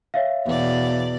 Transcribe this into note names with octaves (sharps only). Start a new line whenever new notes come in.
C#5 E5 F5
E2 B2 D5